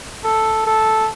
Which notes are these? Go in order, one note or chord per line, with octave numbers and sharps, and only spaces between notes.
A4
A4